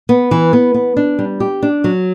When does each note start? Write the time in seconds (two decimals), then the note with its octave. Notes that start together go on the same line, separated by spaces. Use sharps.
0.09 B3
0.31 E3
0.53 B3
0.74 B3
0.97 D4
1.19 G3
1.40 G4
1.63 D4
1.84 F#3